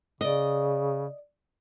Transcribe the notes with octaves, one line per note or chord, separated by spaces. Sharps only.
C#3 D5 D#5